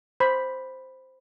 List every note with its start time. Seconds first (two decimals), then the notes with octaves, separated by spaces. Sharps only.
0.20 C5 B5